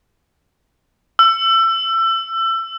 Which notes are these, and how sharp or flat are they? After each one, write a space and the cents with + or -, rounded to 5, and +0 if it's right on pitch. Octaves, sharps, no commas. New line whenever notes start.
E6 +25